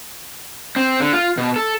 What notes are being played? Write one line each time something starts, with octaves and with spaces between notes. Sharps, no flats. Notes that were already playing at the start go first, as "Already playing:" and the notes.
C4
D3
F4
B2
A4